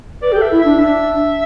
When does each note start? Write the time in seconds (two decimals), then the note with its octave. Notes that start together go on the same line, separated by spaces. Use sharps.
0.22 B4 D5
0.32 G4 A4 G5
0.42 E5
0.51 E4
0.61 D4 E5
0.80 D4 E5